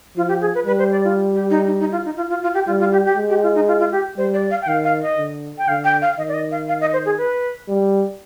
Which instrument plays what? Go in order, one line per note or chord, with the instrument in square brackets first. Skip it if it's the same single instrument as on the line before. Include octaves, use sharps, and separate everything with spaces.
[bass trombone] F3 [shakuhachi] F4
[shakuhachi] G4
G#4
B4
[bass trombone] G3 [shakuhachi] B4
[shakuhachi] C5
D5
F4
G4
D#4
D#4
D#4
F4
D#4
F4
F4
F4
G4
[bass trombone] G3 [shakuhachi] F4
[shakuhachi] F4
G4
G4
[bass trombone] G#3
[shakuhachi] G4
F4
D#4
F4
F4
G4
[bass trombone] G3 [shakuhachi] C5
[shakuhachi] D5
F5
G5
[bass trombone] D#3 [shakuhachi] F5
[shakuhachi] F5
D#5
[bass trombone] D3
[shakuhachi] G5
[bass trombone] D3 [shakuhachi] F5
[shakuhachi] G5
F5
[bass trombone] D#3 [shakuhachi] D#5
[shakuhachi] D5
D#5
F5
F5
D#5
C5
G#4
B4
[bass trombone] G3